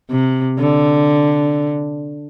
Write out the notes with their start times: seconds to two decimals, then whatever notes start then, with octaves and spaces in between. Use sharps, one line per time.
0.10 C3
0.59 D3